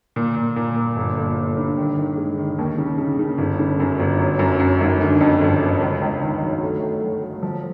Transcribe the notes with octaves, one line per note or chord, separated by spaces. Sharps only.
A#2
A#2
A#2
A#2
G1
G1
G1
G2
D#3
D#3
G#3
D#3
D#2
C#3
C#3
C#3
G1
C#3
F#2
G1
F#3
F#2
F#2
G#1
D3
F2
G1
G1
C#2
C#2
D#3
F#3
A3
A3
F#3
A3
F3